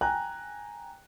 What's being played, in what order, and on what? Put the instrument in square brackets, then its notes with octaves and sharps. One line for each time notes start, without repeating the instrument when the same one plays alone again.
[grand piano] G5 G#5 A#5 F#6